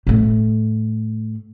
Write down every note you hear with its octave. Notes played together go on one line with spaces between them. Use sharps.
A2 A3